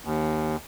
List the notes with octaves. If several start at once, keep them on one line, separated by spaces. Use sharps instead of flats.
D#2